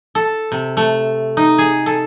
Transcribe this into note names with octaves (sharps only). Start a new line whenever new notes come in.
A4
C3
A3
D#4
G#4
A4